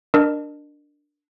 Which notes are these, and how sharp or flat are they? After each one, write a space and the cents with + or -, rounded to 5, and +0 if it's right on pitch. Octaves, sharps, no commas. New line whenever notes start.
D4 +0 A#4 +0 D#5 -40